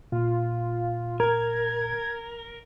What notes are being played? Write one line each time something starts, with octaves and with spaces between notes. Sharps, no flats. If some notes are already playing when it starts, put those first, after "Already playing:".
A#2 F4
A#4 G#6